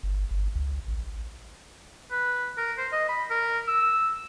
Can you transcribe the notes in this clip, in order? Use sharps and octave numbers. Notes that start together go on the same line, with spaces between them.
G1
G1
C#2
A1
B4
A#4
C5
D#5
B5
A#4
E6